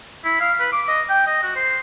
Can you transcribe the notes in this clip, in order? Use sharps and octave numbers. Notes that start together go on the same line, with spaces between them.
E4
F5
B4
D6
D#5
G5
D#5
F#4
C5